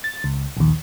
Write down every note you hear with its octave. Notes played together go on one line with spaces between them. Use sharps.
A6
C#2
A#1 D#2